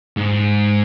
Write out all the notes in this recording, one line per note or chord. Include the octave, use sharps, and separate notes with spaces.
G#2